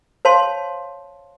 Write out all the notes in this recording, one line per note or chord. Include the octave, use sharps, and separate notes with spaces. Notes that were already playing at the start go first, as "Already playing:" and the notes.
C5 C#5 F5 A5 C6